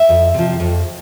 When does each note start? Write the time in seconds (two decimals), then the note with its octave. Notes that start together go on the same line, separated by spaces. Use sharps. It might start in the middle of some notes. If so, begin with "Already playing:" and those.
Already playing: E5
0.09 F2
0.34 C3 F3
0.60 F2